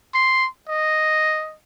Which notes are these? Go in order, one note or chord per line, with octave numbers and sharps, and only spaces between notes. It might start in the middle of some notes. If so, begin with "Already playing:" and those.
C6
D#5